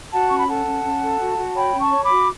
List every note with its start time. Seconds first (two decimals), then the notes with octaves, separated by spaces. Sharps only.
0.13 F#4 F#5 A5
0.29 C#4 C#6
0.38 B5
0.48 A4 F#5 A5
0.67 C#4
0.84 C#4
1.02 A4
1.20 F#4
1.37 F#4
1.55 C#5 G5 B5
1.73 C#4
1.79 A5 C#6
1.91 C#5
2.03 B5 D6
2.10 F#4